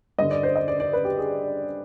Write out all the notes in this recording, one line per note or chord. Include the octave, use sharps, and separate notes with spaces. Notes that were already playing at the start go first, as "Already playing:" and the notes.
G2 D3 D#5
D5
C5
D#5
D5
D5
B4
G4
G#4